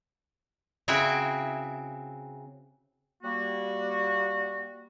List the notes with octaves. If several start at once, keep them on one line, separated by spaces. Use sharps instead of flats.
C#3 C4 E4 F#4 G5
G3 A#3 F#4